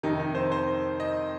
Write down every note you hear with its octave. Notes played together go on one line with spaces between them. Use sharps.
F2 C3 D#3 D#4
D#4
C5
C5
D#5